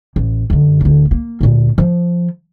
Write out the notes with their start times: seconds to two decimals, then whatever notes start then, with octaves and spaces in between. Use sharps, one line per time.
0.16 A1
0.50 F#2 D3
0.81 D1 D3
1.11 A#3
1.41 D2 A#2
1.78 F3